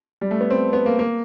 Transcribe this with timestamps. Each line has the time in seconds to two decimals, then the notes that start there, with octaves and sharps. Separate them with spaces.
0.21 G3
0.31 A3
0.41 B3
0.50 C4
0.73 B3
0.86 A#3
0.99 A#3